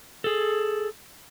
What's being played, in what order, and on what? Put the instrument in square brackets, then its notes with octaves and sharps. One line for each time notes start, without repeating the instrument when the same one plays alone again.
[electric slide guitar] G#4 A4